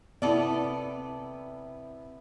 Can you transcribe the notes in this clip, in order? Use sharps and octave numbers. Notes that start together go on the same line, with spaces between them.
C3 B3 E4 A4 D5